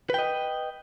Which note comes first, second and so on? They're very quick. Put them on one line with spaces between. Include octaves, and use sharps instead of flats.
B4 G5 D#5